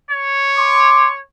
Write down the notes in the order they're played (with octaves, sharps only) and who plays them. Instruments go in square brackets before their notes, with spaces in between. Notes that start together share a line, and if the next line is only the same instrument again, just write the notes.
[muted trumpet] C#5
[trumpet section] C6 D6